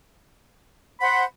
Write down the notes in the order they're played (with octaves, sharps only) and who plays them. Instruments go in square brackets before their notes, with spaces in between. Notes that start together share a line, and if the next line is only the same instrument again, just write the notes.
[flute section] C5 F#5 [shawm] B5